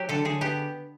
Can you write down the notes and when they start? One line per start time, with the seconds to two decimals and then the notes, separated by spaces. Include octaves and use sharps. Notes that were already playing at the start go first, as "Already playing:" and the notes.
Already playing: F#3 G4
0.09 D3 A4
0.25 D3 G#4
0.41 B3 G4